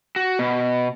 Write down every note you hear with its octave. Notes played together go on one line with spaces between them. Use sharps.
F#4
B2